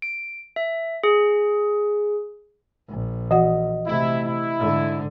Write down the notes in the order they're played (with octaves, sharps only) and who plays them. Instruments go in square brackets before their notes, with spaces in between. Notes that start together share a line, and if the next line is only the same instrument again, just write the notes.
[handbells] D7
E5
G#4
[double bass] A#1
[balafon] E3 F#4 F#5 [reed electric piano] D#5
[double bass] C3 A3 [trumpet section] E4
[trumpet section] E4
[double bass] G#2 D3